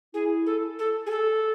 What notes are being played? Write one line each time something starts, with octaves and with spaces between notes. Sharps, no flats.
E4 G#4
A4
A4
G#4
A4